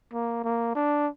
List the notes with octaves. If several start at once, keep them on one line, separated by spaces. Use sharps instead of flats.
A#3
A#3
D4